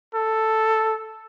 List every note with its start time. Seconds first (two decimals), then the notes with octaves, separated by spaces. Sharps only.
0.15 A4